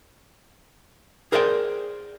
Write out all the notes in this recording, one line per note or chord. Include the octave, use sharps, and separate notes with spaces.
G#4 A#4 C5 D5 F5 G5